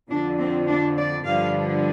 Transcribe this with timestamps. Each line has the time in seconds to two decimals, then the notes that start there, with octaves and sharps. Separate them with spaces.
0.10 F2 D3 F3 D4
0.39 C4
0.68 D4
0.97 D5
1.25 G2 D3 F3 F5